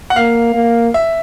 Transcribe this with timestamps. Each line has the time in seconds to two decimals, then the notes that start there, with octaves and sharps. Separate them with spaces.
0.10 F#5
0.16 A#3 F5
0.55 A#3
0.94 E5